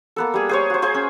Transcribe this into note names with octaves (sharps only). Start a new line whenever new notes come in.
A#3 B3 A4
G3 G#4
G#4 C5 C#5
F#4 C5
G#4 C5 G#5
C#4